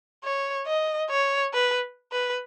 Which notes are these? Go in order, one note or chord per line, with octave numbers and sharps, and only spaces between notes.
C#5
D#5
C#5
B4
B4